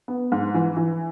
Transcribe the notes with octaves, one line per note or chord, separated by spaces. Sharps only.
B3
G#2
E3
E3